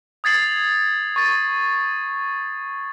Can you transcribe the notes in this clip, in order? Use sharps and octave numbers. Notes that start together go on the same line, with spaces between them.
D#6 G#6 A6 C7 F#7
C#6 A6